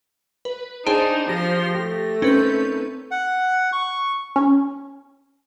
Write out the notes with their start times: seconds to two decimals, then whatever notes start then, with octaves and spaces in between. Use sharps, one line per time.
0.45 B4
0.87 D4 D#4 G#4 C5 G5 A5
1.29 F3 G4 C6 A#6
1.75 A3 G4
2.22 C4 C#4 D#4 A#4 B4 G6
3.11 F#5
3.73 C#6
4.36 C#4